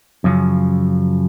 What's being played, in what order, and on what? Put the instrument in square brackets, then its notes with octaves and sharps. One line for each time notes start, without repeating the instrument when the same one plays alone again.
[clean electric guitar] F#2 C#3 F3